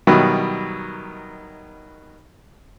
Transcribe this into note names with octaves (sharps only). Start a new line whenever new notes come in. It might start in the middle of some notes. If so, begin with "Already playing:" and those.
B2 D#3 F#3 G3 E4